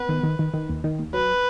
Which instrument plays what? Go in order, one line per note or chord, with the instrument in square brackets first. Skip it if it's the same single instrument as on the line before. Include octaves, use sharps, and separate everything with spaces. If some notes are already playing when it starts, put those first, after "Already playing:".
Already playing: [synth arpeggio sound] B3 [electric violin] B4
[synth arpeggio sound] D#3
D#3
D#3
D#3
D#2
D#3
D#2
[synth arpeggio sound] F#3 [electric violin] B4